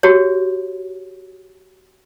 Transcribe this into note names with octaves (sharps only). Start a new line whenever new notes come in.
F#4 G4 C#5